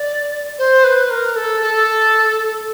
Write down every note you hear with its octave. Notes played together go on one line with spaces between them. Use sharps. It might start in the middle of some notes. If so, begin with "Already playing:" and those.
Already playing: D5
C5
B4
A#4
A4
A4